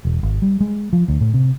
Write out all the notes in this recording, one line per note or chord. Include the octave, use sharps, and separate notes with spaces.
E1
G#1
G3
G#3
F3
D2
A2
C3